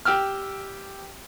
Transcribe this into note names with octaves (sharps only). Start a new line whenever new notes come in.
G4 G5 E6 F6